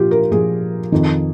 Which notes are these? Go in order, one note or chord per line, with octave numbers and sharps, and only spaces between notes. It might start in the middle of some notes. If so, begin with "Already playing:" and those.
Already playing: A#2 F3 F4 G4
A#4
A#2 F3 G#4
F2 D#3